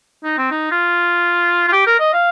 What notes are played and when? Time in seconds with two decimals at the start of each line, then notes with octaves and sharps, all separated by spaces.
0.24 D#4
0.38 C4
0.51 D#4
0.72 F4
1.68 F4
1.72 G4
1.87 A#4
2.00 D#5
2.13 F5